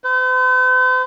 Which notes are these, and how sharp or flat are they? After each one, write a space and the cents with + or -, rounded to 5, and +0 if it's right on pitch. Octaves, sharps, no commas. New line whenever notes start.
C5 -45